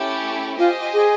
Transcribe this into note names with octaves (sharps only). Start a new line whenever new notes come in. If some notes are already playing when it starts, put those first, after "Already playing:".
Already playing: A3 C#4 E4 G4
F4 G4 C5 D#5 G#5
G#4